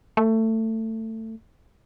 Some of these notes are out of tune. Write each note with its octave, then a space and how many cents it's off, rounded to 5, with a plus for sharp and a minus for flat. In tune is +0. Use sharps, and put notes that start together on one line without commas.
A3 +20